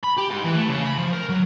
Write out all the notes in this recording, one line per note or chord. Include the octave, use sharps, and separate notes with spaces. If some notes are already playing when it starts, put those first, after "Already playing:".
B5
G4
G#2
E3
A3
C#3
B5
F3
A#4
F#3